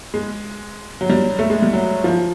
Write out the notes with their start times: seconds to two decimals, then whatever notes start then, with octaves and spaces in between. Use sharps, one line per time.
0.14 G#3
1.01 F#3
1.10 G3
1.39 A3
1.50 G#3
1.62 G3
1.73 F#3
2.04 F3